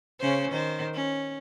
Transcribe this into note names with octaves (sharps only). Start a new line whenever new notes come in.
C#3 C#4 C5
D#3 C5
C#4